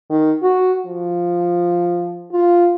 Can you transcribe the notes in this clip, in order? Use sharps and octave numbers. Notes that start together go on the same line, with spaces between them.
D#3
F#4
F3
F4